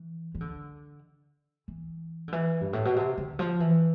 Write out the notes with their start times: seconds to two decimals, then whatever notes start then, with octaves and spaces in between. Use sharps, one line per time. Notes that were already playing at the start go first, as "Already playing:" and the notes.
Already playing: E3
0.35 E3
0.41 D3
1.68 E3
2.28 D3
2.32 E3
2.61 G2
2.73 A2
2.85 B2
2.96 C3
3.18 D3
3.39 F3
3.60 E3